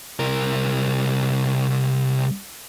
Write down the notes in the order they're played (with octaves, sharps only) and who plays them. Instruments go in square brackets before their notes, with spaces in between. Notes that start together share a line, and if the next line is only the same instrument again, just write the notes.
[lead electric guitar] C2 A#4